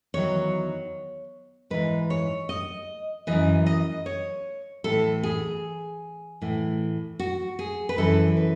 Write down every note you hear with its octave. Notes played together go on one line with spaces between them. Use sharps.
E2 D#3 F#3 C#5
G#2 E3 B4
C#5
D#5
F#2 C#3 E3 D#5
D#5
C#5
A2 E3 A4
G#4
A2 E3
F#4
G#4
B4
F#2 E3 A4
B4